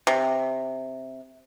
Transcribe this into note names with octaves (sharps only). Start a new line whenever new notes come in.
C3